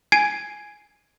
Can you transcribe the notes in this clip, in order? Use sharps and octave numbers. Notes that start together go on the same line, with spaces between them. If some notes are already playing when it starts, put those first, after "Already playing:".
G#5 G#6 C7 D7 D#7